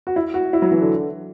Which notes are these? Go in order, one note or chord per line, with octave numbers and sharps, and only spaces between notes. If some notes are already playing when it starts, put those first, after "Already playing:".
F#4
E4
F#4
E4
F#3
E3
D3